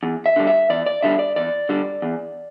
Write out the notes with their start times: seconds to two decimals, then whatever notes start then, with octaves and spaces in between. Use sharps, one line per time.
0.03 E2
0.26 E5
0.36 D3 G3
0.47 E5
0.70 E2 D5
0.86 D5
1.03 D3 G3 E5
1.19 D5
1.36 E2 D5
1.69 D3 G3
2.02 E2